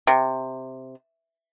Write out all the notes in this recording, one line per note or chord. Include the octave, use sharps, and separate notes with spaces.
C3